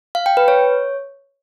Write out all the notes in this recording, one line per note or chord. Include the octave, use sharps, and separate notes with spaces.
F5
G5
B4
C#5